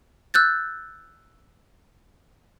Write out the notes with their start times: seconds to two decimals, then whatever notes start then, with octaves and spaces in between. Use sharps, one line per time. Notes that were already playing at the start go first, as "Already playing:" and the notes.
0.34 E6 F#6 G6 A6